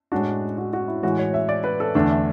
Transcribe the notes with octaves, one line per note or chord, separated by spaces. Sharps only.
A2 G#3 D4 F#4
F#4
F#4
E4
A2 E3 G#3 F#4
C#5
E5
D5
B4
A4
E2 D3 A3 D4 E5
E5